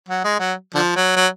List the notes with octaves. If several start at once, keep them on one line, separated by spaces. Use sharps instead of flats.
F#3
G#3
F#3
D3 F3
F#3
F#3